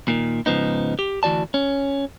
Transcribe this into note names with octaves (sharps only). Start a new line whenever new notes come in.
A#2 D#3
G#2 C#3 F3 B3 D#4
G4
D2 E3 F#4 D5 A5
C#4